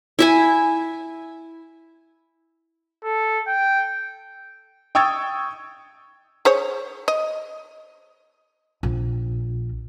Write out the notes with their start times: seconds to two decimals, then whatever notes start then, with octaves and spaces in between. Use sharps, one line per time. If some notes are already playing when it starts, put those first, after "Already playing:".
0.19 E4 E5 G#5
3.04 A4
3.47 G5
4.95 G5 C#6 D#6 E6 G#6 A6
6.45 G#4 C5 C#5
7.08 D#5
8.83 A#1